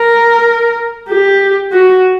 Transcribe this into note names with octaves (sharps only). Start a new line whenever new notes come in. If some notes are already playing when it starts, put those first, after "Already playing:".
Already playing: A#4
G4
F#4